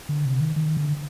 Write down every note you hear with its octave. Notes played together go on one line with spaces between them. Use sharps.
D3
C3
D#3
D#3
D3